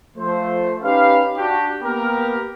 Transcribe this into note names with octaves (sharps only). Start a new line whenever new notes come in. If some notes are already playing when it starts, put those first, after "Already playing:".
F3 A3 C5
C#4 D#4 G4 B4 F5
D4 F#4 G4
A#3 B3 G4 A#4